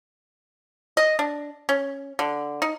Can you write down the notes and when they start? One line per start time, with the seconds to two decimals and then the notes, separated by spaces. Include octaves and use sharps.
0.97 D#5
1.19 D4
1.69 C#4
2.19 D3
2.62 D#4